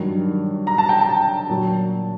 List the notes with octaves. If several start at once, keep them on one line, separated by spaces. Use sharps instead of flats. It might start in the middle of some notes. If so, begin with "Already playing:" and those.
Already playing: G2 D#3 F#3
A#5
A5
G5
A5
A#2 F#3